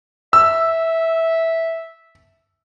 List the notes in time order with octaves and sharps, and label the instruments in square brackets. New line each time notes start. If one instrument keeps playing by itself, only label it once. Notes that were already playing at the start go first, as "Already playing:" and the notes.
[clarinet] E5 [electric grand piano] E6